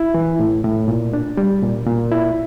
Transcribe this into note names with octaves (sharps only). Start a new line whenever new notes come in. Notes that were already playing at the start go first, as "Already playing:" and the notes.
Already playing: E4
E3
A2
A2
A#2
D4
G3
A#2
A#2
E4